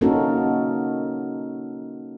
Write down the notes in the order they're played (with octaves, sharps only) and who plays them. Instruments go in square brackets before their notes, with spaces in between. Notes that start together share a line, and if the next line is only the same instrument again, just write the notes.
[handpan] A#3 C#4 D#4 F#4 A4 A#4